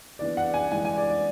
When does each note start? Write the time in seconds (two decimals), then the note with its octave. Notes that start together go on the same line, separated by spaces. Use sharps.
0.19 E3 B3 D4 D5
0.37 F#5
0.54 G#5
0.72 E3 G#3 D4 G#5
0.85 G#5
0.98 D5
1.10 D5